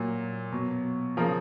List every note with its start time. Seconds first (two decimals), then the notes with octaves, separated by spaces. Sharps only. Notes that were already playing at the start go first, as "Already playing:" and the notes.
Already playing: A#2 F#3
0.52 B2 F#3
1.17 C#3 F3 A#4